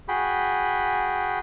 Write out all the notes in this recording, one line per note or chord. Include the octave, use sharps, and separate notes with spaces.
F#4 G#4 G5 B5